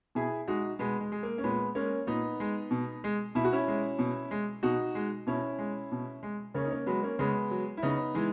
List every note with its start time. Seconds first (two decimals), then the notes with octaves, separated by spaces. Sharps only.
0.15 B2 E4 G#4
0.48 G#3 D#4 F#4
0.79 B2 G#3 B3
1.00 G#3
1.12 G#3
1.23 A#3
1.38 C#4
1.44 A#2 G#3 B3
1.75 G#3 A#3 C#4
2.07 A#2 B3 D#4
2.40 G#3
2.71 B2
3.04 G#3
3.35 B2 E4
3.44 F#4
3.53 C#4 E4
3.68 G#3
3.99 B2
4.31 G#3
4.63 B2 D#4 F#4
4.95 G#3
5.27 B2 C#4 E4
5.59 G#3
5.92 B2
6.23 G#3
6.54 C#3 A#3 C#4
6.65 D#4
6.71 A#3 C#4
6.86 F#3 G#3 B3
7.02 A#3 C#4
7.19 C#3 G#3 B3
7.51 F#3
7.77 E4
7.83 C#3 B3 D#4
8.15 E3 G#3